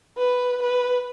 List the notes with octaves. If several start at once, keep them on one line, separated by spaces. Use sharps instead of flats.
B4
B4